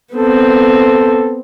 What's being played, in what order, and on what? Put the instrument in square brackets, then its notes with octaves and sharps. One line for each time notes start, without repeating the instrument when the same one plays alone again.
[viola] B3 C4 [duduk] A4